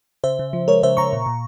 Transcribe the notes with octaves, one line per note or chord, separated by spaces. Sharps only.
C#3 C5 E5
C#3
F3
G#3 A#4 C#5
C#3 C5 E5
C#3 A#5 C#6
A#2
A#2